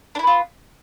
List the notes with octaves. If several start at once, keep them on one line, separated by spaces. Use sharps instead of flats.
B3 D4 E4 F4